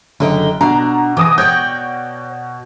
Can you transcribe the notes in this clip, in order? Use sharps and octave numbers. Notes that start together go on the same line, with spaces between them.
F#1 D3 D#5 G5
B2 D4 A#5
E3 D6 D#6 A#6
C#5 D5 G5 G6